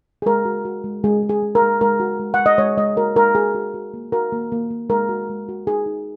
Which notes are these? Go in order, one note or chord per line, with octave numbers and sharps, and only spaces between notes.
G#4
G#3 A#4
F#4
F#4
G#3
G#3 G#4
G#3
G#4
G#3
A#4
G#3
G#3 A#4
F#4
G#3
F#5
G#3
D#5
G#3 C#5
G#3 D#5
F#4 A#4
G#3 A#4
F#4 G#4
F#4
F#4
A#3
F#4 A#4
A#3
A#3
A#3
G#3 A#4
F#4
G#3
F#4
D#4 G#4
D#4